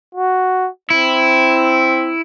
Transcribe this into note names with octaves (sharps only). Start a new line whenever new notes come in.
F#4
C4 E4